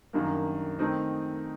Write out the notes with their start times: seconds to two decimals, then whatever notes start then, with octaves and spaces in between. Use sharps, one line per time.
0.13 F#2 D#3 G3 A#3 D4
0.79 D#3 A3 C4 D#4